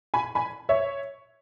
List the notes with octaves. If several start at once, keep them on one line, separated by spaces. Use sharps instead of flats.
G#5 B5
G#5 B5
C#5 E5